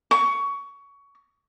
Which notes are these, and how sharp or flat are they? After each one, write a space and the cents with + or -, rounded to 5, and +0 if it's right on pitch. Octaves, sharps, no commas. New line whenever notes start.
C#6 +20